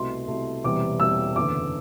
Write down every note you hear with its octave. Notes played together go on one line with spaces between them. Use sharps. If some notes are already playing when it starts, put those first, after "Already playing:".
Already playing: C2 B2 A3 C6
C2 B2 A3
E1 E2 C3 G3 D6
E1 E2 C3 G3 E6
F#1 E2 D3 D6